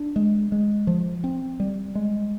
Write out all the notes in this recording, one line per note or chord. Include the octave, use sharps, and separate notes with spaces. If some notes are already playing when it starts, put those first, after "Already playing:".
Already playing: D4
G#3
G#3
F3
C4
G3
G#3